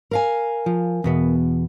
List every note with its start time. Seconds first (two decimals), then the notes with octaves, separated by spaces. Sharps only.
0.11 A#4 F5 G#5
0.66 F3
1.04 E2 B2 B3